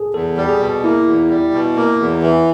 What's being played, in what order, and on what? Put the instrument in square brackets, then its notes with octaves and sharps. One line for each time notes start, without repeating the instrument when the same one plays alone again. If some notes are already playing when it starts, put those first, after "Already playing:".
Already playing: [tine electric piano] G#4 A4
[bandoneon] E2 [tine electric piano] A4
[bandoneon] G3
[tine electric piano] G#4
[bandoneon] B2
[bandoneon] A#3 [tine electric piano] E4
[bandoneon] E2
G3
B2
A#3
E2
E3